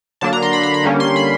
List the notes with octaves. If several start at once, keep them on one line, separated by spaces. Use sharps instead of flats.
D3 F#3 A#3 D4 A5
A#5
C6
B5
B5
B5
D3 G3 A#3 C#4
C6
B5